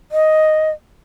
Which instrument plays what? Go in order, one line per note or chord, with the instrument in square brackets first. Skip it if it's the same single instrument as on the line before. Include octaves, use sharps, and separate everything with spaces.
[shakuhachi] D#5